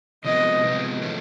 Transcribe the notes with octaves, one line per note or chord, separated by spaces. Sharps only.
C3 F3 G#3 B3 D#4 D#5
C3 F3 G#3 B3 D#4
F3 A3 C#4